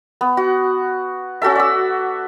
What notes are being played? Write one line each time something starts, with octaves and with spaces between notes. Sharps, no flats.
B3
F#4
C#4 F#4 A4 E5
D5 E6